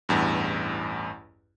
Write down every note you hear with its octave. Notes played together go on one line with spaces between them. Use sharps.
A1 E2 G2